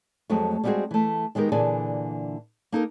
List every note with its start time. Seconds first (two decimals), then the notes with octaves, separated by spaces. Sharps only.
0.30 F2 F#3 G#3 A3
0.64 G3 G#3 B3 C4 F#4 G#4
0.91 E3 A3
1.35 D#3 G#3 B3 G4 A#4
1.52 A#2 D3 E3 G#4 D5 G#5
2.72 A#3 D#4 A4 A#4